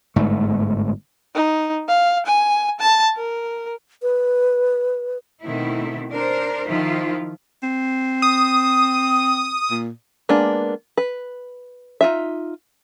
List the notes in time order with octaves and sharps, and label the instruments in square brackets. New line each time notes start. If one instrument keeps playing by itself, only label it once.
[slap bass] G1 G#2 A3
[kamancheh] D#4
F5
G#5
A5
A#4
[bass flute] B4
[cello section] B2 D#3 A3 C4 E4
D4 A#4 C5
D#3 F3 E4 F4
[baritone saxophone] C4
[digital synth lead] D#6
[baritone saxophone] A#2
[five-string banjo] G#3 A#3 B3 D4
B4
D#4 F4 E5